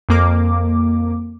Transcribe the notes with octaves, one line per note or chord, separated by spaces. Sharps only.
F2 A#3 D6